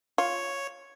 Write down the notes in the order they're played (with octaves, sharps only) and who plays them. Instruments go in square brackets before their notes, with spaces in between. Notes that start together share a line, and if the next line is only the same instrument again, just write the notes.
[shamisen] F4 [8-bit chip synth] C#5